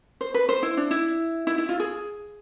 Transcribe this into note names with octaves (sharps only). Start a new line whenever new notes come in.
C5
B4
C5
E4
D4
E4
E4
E4
F4
G#4